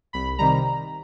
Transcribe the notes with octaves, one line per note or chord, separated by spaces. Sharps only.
C2 B5
C3 D#3 G3 A#5